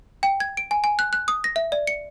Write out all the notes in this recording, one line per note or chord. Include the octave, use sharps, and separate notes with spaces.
G5
G#6
D7
G#5
G#5
F#6
F#6
D#6
A#6
E5
D5
C#7